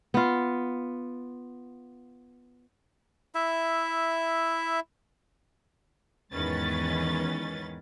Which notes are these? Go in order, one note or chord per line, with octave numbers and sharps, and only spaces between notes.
B3 F4
E4 E5
E2 G#2 D#3 C#4 B4 A6